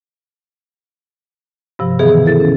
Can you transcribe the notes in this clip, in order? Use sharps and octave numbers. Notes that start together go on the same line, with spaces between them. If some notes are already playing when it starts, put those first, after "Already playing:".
G2 C3 F3
B2 D#3 E3 B3 G#4
B2 E4 A4 A6
C#4